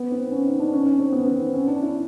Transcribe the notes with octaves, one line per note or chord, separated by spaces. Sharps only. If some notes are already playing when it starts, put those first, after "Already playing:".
Already playing: B3
C4
C#4
D#4
D4
C#4
C#4
C4
B3
C4
C#4
D4
E4